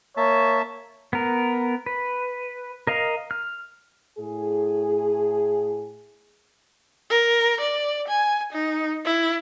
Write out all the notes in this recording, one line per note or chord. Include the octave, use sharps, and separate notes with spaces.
A#3 C#5 E5 A5
B3 A#4
B4
A#4 D#5 F5
F6
A2 G#4
A#4
D5
G#5
D#4
E4